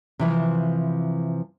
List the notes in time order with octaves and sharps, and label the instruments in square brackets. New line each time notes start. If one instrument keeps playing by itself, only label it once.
[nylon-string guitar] C3 E3 F3